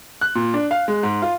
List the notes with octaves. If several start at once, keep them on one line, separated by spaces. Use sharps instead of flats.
F#6
A#2
D4
F5
G#3
G#2
F4